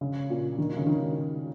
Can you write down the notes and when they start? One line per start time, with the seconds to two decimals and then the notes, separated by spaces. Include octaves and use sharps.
0.01 C#3
0.30 A#2
0.58 D#3
0.77 C#3
0.87 D#3